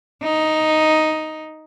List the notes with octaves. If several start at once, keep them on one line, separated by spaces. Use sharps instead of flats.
D#4